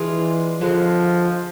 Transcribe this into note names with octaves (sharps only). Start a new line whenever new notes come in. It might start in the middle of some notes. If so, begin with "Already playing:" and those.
Already playing: E3 G#3 D4 F4
D3 F3 G#3 C4